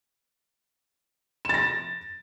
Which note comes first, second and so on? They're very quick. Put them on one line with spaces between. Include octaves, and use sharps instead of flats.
E7 A6 A#6